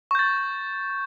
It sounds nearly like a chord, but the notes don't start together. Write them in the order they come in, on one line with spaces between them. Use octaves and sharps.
C#6 G6 A6